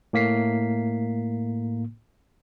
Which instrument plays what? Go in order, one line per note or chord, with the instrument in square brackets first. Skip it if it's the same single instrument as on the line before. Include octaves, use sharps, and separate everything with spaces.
[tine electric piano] A2 A#3 B6 C7